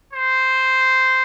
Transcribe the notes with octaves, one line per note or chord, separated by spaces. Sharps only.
C5